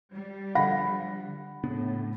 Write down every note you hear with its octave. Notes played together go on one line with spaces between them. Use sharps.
G3
D3 F3 F#5 B5 A#6
A2 C#3 B3 D4